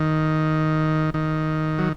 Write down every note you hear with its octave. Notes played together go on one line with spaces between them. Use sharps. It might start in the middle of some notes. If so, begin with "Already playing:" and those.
Already playing: D#3
D#3
F#3